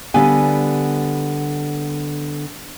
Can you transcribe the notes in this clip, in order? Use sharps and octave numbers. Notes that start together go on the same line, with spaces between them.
D3 G3 B3 F5 G#5